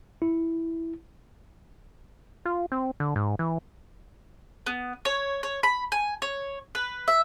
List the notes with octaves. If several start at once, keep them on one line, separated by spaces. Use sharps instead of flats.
E4
F4
C4
D3
G#2
E3
B3
C#5
C#5
B5
G#5
C#5
B4
E5